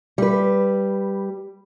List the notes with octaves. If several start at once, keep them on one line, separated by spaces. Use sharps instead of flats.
G3 B4